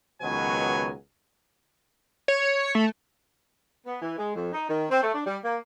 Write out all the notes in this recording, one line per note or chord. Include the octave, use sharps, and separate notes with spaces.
C#2 B2 D#3 F#3 B3 G#5
C#5
A3
B3
E3
G#3
F2
D#4
D#3
C4
A3
D4
G3
A#3